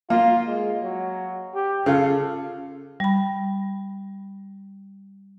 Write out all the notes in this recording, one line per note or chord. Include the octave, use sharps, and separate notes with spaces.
A#3 F4
G#3
F#3
G4
C#3 F4 A4
G3 B5